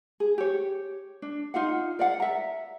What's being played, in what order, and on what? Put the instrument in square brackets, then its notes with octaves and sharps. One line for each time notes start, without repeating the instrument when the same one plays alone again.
[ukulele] G#4
G4 C#5
D4
D#4 F4 F5 F#5
A#4 D5 F5 F#5
E5 A#5